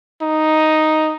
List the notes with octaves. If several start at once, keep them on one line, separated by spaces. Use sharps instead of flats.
D#4